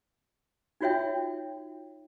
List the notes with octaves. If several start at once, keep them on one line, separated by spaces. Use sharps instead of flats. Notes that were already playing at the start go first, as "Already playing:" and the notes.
D#4 F4 F#4 C#5 E5 G5